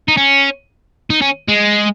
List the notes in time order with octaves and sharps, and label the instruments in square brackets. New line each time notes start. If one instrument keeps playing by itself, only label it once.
[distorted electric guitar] D#4
C#4
D#4
C#4
G#3